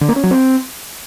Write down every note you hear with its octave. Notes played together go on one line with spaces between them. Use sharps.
D3
A#3
C#4
F#3
C4